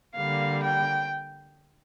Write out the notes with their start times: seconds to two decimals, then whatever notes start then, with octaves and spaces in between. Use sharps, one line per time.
0.16 D3 G3 A#3 F5
0.63 G5